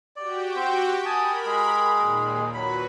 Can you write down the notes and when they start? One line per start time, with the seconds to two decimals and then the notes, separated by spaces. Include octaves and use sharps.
0.16 F#4 G4 D5 G5
0.56 C4 C5
1.06 A#4 G#5 A5 B5 D#6
1.46 G#3 G#4
1.95 D#2 A#2
2.54 F#3 F#4 B4 B5